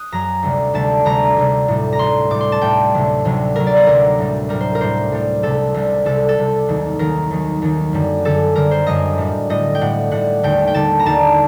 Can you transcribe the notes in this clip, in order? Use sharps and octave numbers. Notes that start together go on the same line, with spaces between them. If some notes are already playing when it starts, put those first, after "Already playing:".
Already playing: D#6 F#6
F#2 F#3 A#5
D2 C3 G3
D2 C3 G3 A5
D2 C3 G3 A#5
D2 C3 G3
A2 G3
A#5
A2 G3 C6
A2 G3 D6
C6
A5
A2 G3 G5
D2 C3 F#3
D2 C3 F#3
D2 C3 F#3 A#4
D5
F#5
D2 C3 F#3 A#4
A2 G3
A2 G3 A#4
C5
A#4
A2 G3 C5
A2 G3
C2 C3 G3 A4
C2 C3 G3
C2 C3 G3 A4
A4
C2 C3 G3
D#2 D#3 F#3
D#2 D#3 F#3 A#4
D#2 D#3 F#3
D#2 D#3 F#3
F#2 D3 G3
F#2 D3 G3 A4
F#2 D3 G3 A#4
C5
F#2 D3 G3 D#5
A2 G3
A2 G3 D#5
G5
A2 G3 F#5
A2 G3 F#5
D#2 D3 G3 G5
G5
D#2 D3 G3 A5
A#5
D#2 D3 G3 A5